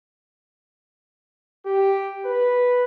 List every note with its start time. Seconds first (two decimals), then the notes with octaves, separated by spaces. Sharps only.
1.66 G4
2.26 B4